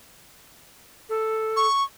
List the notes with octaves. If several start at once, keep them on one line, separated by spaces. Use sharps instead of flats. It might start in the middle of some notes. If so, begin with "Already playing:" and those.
A4
C#6